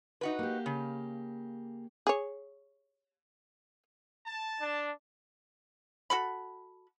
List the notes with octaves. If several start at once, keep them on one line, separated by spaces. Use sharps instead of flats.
D#4 F#4 B4
A#3 G4
C#3
G#4 C#5
A5
D4
F#4 A4 B5